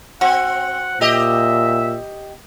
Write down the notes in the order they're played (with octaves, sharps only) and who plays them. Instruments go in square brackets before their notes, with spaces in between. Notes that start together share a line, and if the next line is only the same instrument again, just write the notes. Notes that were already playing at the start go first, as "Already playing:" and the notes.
[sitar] C4 [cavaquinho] F#4 [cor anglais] F#5
[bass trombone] A#2 [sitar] G4 D#5 [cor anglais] E5